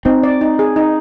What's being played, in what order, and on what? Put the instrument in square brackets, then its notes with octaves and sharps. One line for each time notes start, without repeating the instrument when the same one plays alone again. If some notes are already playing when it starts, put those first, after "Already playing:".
[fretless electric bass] C4 [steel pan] D#4
[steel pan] D5
D#4
G#4
D#4